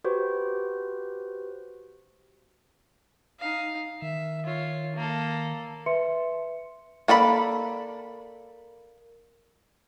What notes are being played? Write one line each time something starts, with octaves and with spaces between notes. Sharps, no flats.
F#4 G4 B4 C5
D#4 F5
D#3 E5
F4 C#5
A#3 A4
B4 E5 C6 C#7
A#3 A4 D5 B5